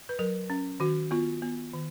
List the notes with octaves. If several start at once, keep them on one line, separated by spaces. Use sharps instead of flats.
B4
F#3 A#4
C#4
D#3 F#4
B3 F4
B3
D#3